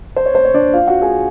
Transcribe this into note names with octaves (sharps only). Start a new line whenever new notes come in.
C5
C#5
C5
C#5
D4 D5
F4 F5
F#4 F#5
G#4 G#5